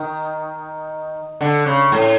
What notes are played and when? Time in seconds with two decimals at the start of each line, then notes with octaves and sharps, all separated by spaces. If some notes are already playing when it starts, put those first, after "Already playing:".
Already playing: D#3
1.41 D3
1.66 C#3
1.92 A2